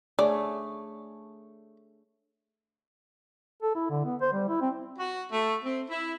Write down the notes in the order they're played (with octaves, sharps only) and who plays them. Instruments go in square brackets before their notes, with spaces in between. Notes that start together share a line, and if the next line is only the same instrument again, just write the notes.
[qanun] A3 [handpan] D4 G#4 C#5 [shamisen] D5
[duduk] A4
E4
D3
B3
C5
G3
E4
C4
[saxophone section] F#4
A3
C4
E4